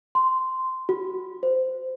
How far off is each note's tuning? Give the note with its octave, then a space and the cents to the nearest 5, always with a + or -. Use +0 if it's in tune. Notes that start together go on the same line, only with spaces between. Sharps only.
C6 -10
F#4 +10
C5 -15